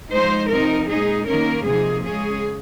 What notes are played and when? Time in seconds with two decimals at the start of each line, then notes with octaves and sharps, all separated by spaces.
0.12 F3 G#3 D#4 C5
0.50 C3 F3 C4 D#4 A#4
0.89 A#2 G#3 D#4 G#4
1.28 D#3 A#3 C#4 A#4
1.66 C3 F3 A#3 D#4 G#4
2.05 C#3 G#3 C#4 G#4